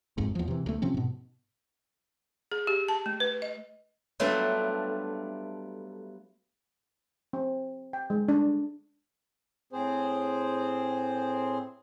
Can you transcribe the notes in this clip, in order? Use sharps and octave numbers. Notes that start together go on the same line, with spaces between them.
G#1 F2 G#2
E2 F3
C3 E3
D2 A3
C3 F3 C4 C#4
G#2 B2
G#4
G4
A5
A3
B4
D#5
F#3 G3 A3 B3 D4 F4
C4
G5
G#3
D4
A2 C4 G#4 C5